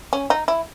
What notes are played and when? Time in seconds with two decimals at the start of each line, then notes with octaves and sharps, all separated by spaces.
0.13 C#4
0.30 D#4
0.48 E4